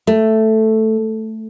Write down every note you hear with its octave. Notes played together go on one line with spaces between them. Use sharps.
A3